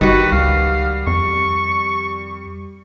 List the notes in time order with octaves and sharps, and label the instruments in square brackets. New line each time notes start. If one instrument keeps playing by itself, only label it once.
[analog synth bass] G1 [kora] D#3 F#4 [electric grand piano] G3 [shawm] B4
[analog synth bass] C#2 [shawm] F5
[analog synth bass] F2 [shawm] C#6